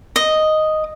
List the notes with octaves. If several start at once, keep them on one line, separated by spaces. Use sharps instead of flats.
D#5